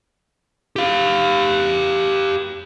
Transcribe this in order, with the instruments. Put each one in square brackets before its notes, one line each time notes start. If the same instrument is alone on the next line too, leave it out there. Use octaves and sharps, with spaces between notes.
[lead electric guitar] G4 F5